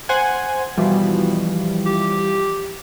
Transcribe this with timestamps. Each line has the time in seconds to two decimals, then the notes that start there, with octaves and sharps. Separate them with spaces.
0.09 C5 F#5 G#5
0.78 B2 E3 F3 G3
1.86 G4